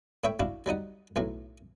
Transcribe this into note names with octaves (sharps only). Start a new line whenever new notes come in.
A2 E4 C#5 E5 G5
D4 E4 F#4 F5
F#3 G3 D#4 F#5
B1 A2 F#3